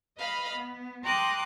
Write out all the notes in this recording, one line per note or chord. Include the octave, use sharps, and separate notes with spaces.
B4 D#5 F5 B5
B3
G5 A#5 C6 D6 D#6 F#6